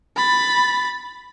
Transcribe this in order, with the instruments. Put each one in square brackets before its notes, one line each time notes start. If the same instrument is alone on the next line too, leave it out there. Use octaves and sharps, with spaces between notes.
[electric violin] B5 A6